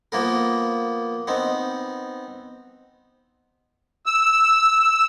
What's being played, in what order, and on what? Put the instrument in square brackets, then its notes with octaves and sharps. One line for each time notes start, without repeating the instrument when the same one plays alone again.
[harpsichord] F3 A#3 B3 A#4
B3 C4 D#4
[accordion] E6